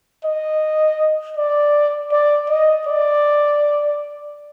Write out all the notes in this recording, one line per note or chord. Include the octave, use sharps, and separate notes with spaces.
D#5
D5
D5
D#5
D5